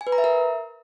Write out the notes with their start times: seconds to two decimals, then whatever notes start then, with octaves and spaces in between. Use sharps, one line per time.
0.01 G#5
0.07 B4
0.12 A#5
0.18 E5
0.24 A#4